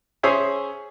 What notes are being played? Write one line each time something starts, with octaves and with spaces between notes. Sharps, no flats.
C#4 G#4 C5 C#5 E5 G#5